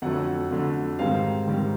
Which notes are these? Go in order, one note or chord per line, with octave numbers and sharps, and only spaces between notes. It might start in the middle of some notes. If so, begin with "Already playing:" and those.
F2 D3 F#3 A3 F#5
F2 D3 F#3 A3
G#2 D#3 G3 C4 F5
G#2 D#3 G3 C4